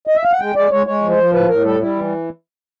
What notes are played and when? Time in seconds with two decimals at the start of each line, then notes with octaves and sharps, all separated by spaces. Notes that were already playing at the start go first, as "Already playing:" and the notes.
0.07 D#5
0.16 E5
0.24 F5
0.32 F#5
0.40 G#3 G5
0.56 G#3 D5
0.71 G#3 C#5
0.86 G#3 C#5
1.02 F3
1.10 C5
1.18 F3
1.33 A2 B4
1.49 A2 A#4
1.64 G3 A4
1.80 G3 E4
1.96 E3